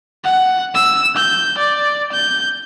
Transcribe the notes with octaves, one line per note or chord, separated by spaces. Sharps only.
F#5
E6
G6
D5
G6